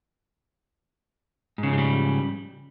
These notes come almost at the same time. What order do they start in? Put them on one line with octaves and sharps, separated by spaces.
G#2 C#3 F3 G#3 G3